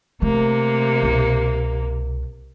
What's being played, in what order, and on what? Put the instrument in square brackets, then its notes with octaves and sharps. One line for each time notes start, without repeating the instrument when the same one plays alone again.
[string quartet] C3 A#3 [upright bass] A3
[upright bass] C2 B2